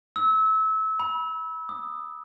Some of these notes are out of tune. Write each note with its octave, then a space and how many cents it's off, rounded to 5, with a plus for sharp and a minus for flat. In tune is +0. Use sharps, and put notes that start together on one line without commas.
E6 -25
B5 -25
D#6 -30